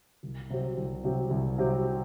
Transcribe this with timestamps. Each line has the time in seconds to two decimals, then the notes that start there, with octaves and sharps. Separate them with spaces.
0.23 C2
0.50 C3 F#3 C4 G4
0.77 C2
1.04 C3 F#3 C4 G4
1.31 C2
1.58 C3 F#3 C4 G4